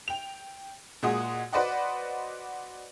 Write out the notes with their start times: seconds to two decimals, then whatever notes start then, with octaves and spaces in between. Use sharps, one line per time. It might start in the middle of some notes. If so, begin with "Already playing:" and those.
0.08 G5 F7
1.03 A#2 G#3 F#4 G#4 D#6
1.53 F#4 B4 C5 D5 D#5 F#5